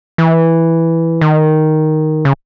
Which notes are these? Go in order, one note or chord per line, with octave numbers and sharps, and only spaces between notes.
E3
D#3
C#3